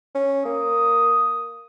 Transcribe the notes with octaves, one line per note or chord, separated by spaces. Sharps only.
C#4
A#3 D#6